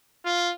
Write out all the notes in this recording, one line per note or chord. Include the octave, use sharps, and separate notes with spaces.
F4